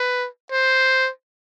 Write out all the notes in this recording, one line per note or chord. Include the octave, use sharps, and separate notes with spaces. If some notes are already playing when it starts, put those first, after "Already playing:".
Already playing: B4
C5